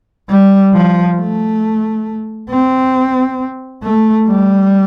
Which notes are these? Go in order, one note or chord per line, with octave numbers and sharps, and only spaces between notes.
G3
F3
A3
C4
A3
G3